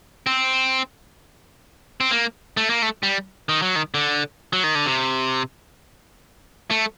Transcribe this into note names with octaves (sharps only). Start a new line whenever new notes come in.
C4
C4
A#3
A3
A#3
A3
G3
D#3
F#3
D#3
D3
F#3
D#3
D3
C3
A3